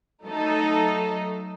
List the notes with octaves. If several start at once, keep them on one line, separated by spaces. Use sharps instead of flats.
F#3 A3 D#4 A4